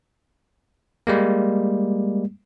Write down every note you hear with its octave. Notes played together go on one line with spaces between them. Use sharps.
G3 G#3 A#3